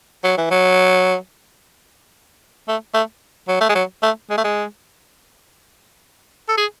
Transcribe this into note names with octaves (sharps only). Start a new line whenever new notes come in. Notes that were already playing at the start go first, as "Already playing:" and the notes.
F#3
E3
F#3
A3
A3
F#3
A3
G#3
F#3
A3
G#3
A3
G#3
A4
G#4